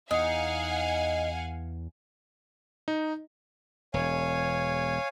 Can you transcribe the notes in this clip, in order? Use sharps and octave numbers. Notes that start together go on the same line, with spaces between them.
E2 D#4 F5 F#5 G#5
D#4
E1 C#5 F5 G#5